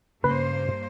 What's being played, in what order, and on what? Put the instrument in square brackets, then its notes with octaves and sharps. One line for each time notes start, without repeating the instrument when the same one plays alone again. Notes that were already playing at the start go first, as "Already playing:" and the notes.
[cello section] G2 A#3 C5 [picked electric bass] C#3 [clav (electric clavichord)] B4